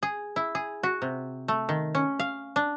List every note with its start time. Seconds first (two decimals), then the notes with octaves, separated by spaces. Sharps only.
0.03 G#4
0.36 E4
0.55 G#4
0.83 F#4
1.02 C3
1.48 A3
1.69 D#3
1.95 C#4
2.19 F5
2.56 D4